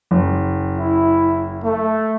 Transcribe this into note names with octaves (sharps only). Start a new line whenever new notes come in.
F#1
E4
A3